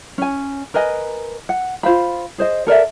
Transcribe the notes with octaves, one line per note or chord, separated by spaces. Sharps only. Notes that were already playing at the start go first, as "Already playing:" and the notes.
C#4 G#5
A#4 B4 D#5 G#5
F#5
F4 C5 F5 B5
G#4 C5 D#5
A4 A#4 D5 E5